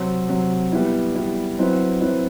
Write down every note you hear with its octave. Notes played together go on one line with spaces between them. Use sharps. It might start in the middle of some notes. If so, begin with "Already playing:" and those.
Already playing: C3 F#3 C4
C3 F#3 C4
G3 B3 E4
G3 B3 E4
F#3 C4 E4 B4
F#3 C4 E4 B4